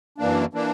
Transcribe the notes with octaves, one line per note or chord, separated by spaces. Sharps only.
F#2 E3 A#3 D4
E3 A#3 D4